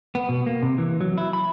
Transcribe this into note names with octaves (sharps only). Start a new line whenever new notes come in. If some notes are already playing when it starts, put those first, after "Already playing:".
B3
B2
A#3
C3
E3
F#3
E4
B5